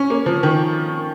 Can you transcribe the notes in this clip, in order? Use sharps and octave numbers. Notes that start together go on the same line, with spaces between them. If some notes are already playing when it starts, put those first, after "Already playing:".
Already playing: C#4
A#3
F3
D#3